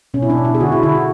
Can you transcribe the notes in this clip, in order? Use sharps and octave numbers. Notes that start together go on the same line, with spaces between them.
B2 C#4
E4
D4
B2
E4
G#4
D3 F#4
E4
D3 E4
F#4